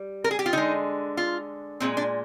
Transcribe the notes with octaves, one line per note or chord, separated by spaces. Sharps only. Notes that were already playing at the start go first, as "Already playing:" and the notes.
Already playing: G3
A#4
G#4
G4
F4
D3 G#3 D#4
F4
A#2 G#3 C4
D4